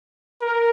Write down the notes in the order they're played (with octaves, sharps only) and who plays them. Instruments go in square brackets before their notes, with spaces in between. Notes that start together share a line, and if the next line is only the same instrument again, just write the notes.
[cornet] A#4